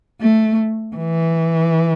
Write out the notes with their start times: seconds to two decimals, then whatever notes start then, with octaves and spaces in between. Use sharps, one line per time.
0.21 A3
0.97 E3